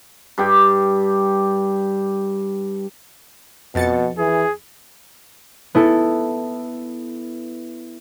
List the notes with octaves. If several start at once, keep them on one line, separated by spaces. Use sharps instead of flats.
G2 G4
F2 B2 A6 C#7
E3 G#4
B3 E4 A4